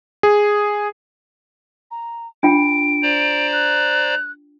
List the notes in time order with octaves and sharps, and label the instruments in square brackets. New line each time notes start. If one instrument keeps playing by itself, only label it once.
[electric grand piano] G#4
[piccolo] A#5
[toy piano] D4 F4 G5 [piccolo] D7
[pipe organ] C5 D5 A#5
[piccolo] F#6